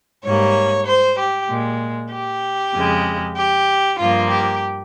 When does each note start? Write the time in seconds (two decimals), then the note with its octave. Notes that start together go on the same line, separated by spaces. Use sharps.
0.24 G#2 G3 A#3 C#5
0.87 C5
1.18 G4
1.49 A#2 G#3
2.12 G4
2.74 F2 C#3 G#3
3.37 G4
3.99 G2 F3 A#3 F4
4.31 G4